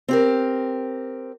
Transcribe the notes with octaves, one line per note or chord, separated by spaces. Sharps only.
C4 G4 A#4